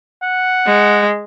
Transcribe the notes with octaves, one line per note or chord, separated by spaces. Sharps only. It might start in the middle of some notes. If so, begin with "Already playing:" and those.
F#5
G#3